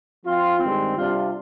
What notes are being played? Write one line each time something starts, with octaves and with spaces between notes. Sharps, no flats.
F3 C4 F4
G2 D#3 G#3 C4
C3 G3 D4 F4